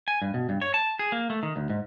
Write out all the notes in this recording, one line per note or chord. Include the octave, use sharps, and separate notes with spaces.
G#5
G2
B2
G2
C#5
A5
G#4
A#3
A3
D#3
D2
G#2